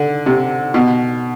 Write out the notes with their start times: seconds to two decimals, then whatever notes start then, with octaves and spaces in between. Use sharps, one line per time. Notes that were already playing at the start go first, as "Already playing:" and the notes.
Already playing: D3
0.26 C3
0.74 B2